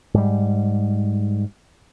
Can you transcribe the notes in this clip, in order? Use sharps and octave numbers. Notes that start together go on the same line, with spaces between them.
G#2 G3